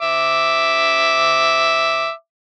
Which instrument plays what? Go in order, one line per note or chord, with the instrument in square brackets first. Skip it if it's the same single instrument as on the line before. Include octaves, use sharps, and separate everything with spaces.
[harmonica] E5 D6